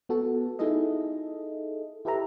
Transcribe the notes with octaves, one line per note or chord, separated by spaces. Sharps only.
B3 F#4 A4
D#4 E4 G#4 A4 D#5
E4 G4 A4 B4 E5 A#5